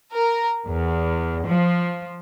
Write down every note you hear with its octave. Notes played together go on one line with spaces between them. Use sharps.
A#4
E2
F3